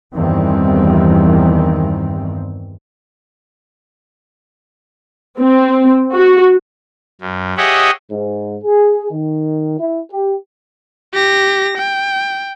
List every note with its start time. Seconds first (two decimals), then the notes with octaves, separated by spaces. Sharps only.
0.14 E2 G2 D#3 E3 G3 C4
5.39 C4
6.13 F#4
7.21 F#2
7.57 G4 G#4 C#5 D#5 E5 F#5
8.11 G#2
8.64 G#4
9.11 D#3
9.79 E4
10.10 G4
11.14 G4 A#6
11.78 G5